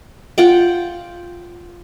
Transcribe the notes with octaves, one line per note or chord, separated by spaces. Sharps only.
F4 F#5 G5